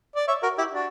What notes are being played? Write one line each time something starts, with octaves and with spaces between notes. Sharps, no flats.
D5
C#5 E5
F#4 A#4
E4 G4
D4 F#4